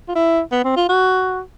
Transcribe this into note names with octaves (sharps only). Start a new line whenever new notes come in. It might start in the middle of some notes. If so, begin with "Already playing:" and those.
F4
E4
B3
C4
F4
F#4